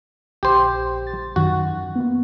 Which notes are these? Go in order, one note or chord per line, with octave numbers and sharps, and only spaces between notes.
A#1 G4 C5
A6
F#2 D#3 F#4
A#3 B3